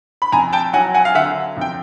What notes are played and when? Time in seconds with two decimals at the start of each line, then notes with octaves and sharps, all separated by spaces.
0.22 B5
0.32 F2 G#5 A#5
0.53 G5 A5
0.73 F#3 F#5 G#5
0.94 F#5 G#5
1.05 F5
1.15 D3 E5 F#5
1.56 F2 G5